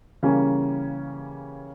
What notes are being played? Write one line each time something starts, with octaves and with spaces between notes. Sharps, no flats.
C#3 E3 G3 A#3 C#4